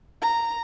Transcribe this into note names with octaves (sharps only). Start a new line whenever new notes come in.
A#5